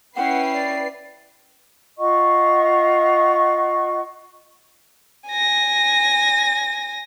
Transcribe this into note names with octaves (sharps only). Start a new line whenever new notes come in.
C#4 E4 B4 F#5 G5 C7
D5
F4 D#5 F#5 C#6
G#5 A#6